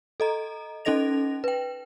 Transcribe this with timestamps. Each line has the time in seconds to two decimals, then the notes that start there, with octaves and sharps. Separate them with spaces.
0.20 A4 D#5 A#5
0.85 C#4 D#4 A4 D#5 A#6 F7
1.44 B4 G5